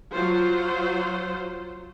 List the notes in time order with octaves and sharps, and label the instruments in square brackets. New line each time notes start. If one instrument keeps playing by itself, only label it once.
[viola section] F#3 F4 C5